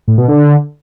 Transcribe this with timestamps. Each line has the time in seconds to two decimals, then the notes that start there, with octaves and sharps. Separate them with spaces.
0.08 A2
0.18 B2
0.28 D3